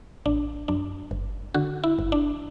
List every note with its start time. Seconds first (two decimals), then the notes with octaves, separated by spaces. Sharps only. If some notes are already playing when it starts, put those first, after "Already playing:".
0.26 A1 D4
0.68 F#2 D4
1.11 G1
1.54 D3 F#4
1.84 E4
1.98 G1
2.12 D4